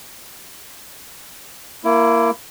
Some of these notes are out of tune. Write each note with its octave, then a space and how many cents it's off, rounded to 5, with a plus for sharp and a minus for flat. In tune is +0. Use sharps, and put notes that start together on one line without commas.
A#3 +0 E4 +20